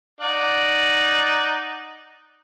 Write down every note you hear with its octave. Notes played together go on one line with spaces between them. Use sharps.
D#4 D5 F#5